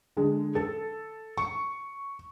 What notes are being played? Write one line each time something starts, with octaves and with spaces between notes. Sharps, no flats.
D3 G#3
A4
C#6